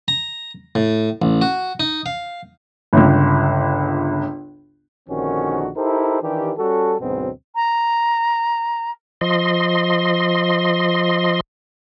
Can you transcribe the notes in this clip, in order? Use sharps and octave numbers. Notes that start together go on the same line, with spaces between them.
A#5
A2
A1
F#4
D#4
F5
G1 C#2
A#1 D3 D#3 C4 C#4 F#4
D#4 E4 G4 A4 A#4 C5
D#3 E3 D4 G4
G3 C#4 F#4 A4
D2 G#2 B2 F#3 B3 C4
A#5
F3 D#5 C6